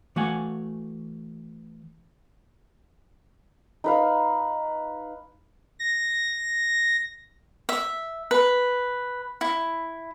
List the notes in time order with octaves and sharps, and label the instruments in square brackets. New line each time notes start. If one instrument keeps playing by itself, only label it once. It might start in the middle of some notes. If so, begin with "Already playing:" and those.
[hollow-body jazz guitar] E3 A3 F#4 F5 F#5 G#5
[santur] D#4 B4 F5
[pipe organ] A#6
[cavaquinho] E5
B4
E4